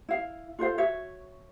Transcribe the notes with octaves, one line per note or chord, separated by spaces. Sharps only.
E4 F5
F4 A4 C5 F5
F#4 C#5 E5